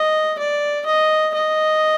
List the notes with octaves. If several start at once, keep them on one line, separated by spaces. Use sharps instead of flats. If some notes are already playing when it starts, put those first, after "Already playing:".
Already playing: D#5
D5
D#5
D#5